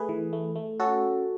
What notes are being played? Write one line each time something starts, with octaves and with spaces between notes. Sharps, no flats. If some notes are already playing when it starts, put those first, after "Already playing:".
Already playing: A3 G#4 B4
E3
A3
A3
C#4 F#4 A4